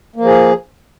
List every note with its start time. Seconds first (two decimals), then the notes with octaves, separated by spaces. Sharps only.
0.16 A#3
0.20 F3
0.25 G#4